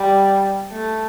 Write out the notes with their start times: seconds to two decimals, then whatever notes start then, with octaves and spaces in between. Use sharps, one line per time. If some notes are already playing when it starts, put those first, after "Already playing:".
Already playing: G3
0.73 A3